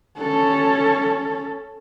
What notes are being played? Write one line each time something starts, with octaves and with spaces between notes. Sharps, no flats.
C#4 A4